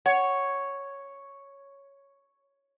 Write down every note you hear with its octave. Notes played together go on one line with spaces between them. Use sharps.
C#5 F#5